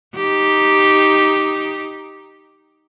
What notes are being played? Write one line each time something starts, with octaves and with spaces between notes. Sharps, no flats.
D#4 G4